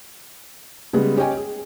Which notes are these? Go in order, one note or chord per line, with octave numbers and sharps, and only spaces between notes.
C#3 G3 G#3 B3
C#4 G4 C#5 D#5 G5 G#5
G#4